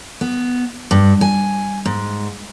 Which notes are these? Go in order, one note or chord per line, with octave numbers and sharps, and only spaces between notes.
B3
G2
G#5
G#2